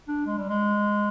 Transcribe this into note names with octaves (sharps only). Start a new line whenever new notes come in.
D4
G#3
G3
G#3